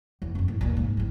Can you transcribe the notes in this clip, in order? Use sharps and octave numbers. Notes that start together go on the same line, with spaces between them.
E2
F#2 B3
A2
D#2 A#2
G#2
G#1 A2